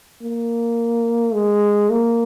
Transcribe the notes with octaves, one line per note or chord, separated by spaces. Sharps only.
A#3
G#3
A#3